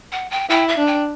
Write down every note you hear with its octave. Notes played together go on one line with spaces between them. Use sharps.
F#5
G5
E4 G5
E5
D4
G5